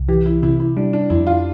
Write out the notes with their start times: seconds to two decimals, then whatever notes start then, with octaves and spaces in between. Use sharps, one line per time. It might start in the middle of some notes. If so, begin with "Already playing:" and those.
Already playing: C2
0.09 E3 G4
0.26 E4
0.42 C3 E4
0.60 E4
0.77 G3 D4
0.93 D4
1.10 F2 E4
1.27 F4